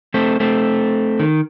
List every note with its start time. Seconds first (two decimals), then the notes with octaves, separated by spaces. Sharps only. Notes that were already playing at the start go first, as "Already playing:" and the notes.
0.14 A3 C4
0.40 A3 C4
1.19 D#3